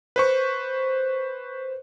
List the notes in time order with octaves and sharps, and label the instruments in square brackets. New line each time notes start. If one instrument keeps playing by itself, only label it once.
[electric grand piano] B4 C5 C#6